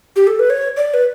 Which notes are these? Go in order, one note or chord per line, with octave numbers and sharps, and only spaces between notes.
G4
A4
B4
C#5
D5
B4